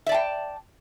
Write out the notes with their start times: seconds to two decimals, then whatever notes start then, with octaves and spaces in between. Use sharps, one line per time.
0.06 E5
0.09 D5
0.12 A5
0.14 G5